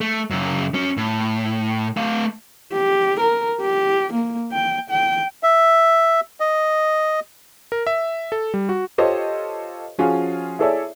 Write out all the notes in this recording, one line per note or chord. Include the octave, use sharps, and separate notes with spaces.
A3
F#2 C#3
F#3 C#4
A2
A3 F5
G4
A#4
G4
A#3
G5
G5
E5
D#5
A#4
E5
A4
G3
F#4
F4 G4 A4 C5 C#5 D#5
F3 C#4 F4 F#4 G#4
E4 G#4 A4 C#5 D5 E5